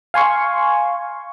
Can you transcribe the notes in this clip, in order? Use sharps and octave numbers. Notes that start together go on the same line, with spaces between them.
F5 G#5 C6 C#6